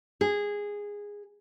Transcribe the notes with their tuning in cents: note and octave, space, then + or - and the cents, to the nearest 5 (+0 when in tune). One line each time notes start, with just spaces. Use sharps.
G#4 -15